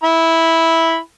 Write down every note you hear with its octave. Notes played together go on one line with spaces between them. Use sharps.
E4 B5